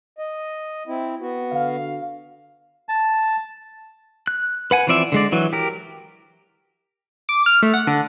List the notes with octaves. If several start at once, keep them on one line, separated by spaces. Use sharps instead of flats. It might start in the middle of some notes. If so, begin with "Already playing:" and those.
D#5
C4 E4
B3 F#4
D3 F5
A5
F#6
B4 F#5 G#5
E3 F3 C4 D5 E5
D3 G#3 D5
E3 F#3
G4 A#4
D6
F6
A3
F#5
D3